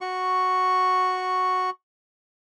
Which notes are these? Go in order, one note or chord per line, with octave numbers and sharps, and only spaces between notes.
F#4 C#6